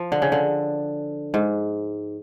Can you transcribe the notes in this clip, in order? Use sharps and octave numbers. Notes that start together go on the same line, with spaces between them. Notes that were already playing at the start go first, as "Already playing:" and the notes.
Already playing: F3
D3
C#3
D3
G#2